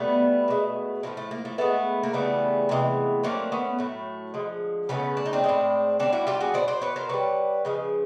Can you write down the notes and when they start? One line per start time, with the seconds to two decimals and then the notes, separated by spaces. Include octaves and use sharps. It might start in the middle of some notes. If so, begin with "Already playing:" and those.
Already playing: B2 G3 A3 B3
0.48 B2 G#3
1.03 A2 F3 A3 A#3
1.17 A3
1.31 A#3
1.45 A3
1.58 A2 F3 G#3 A3 B3
2.03 A#3
2.13 C#3 E3 G3 A3 B3
2.69 C3 E3 G#3
3.23 D3 F#3 A3 A#3 C4
3.52 B3 C#4
3.78 A2 F#3 A3
4.34 D3 F3 G#3
4.89 C#3 F#3 A3 B3 C#4
5.17 D4
5.26 D#4
5.33 C4 D4
5.44 F3 G#3
5.49 A2
6.00 D3 G3 C4 D4
6.13 E4 F#4
6.27 F4 G4
6.41 F#4 G#4
6.54 B2 G#3 C5 D5
6.68 C5 D5
6.81 B4 C#5
6.96 A#4 C5
7.09 D3 G3 B4 C#5
7.65 C#3 F3 G#3